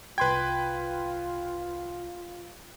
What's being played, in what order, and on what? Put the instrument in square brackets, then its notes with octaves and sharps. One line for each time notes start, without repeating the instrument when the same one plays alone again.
[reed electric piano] C2 C6 G#6 [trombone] F4 [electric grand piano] B4 G5